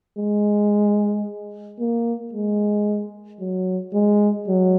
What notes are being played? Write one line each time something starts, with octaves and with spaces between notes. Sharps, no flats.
G#3
A#3
G#3
F#3
G#3
F#3